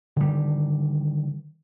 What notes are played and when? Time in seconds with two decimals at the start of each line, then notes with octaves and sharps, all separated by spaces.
0.16 D3 D#3 G3